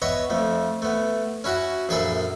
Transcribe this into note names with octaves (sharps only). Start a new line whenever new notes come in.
B3 C#5 D#5 E5 C#6
F2 A3
A3 B3
C#4 E4 F#4 F#5
A#1 F#2 G#4 A4 E5 B5